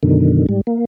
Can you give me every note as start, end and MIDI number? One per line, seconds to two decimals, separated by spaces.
0.03 0.46 42
0.03 0.46 47
0.03 0.46 50
0.03 0.46 51
0.49 0.61 44
0.49 0.61 55
0.67 0.85 58